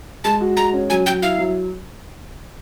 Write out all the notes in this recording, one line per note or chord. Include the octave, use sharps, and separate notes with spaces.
G#3 A5
F#4
G#3 A#5
C#4
F#3 G#5
F#3 G5
E4 F5
F#3